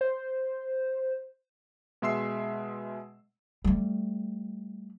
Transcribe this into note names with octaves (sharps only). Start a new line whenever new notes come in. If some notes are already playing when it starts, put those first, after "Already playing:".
C5
B2 G#3 E5 C6 E6 C7
G3 A3